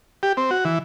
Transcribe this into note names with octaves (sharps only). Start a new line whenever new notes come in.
G4
C4
F#4
E3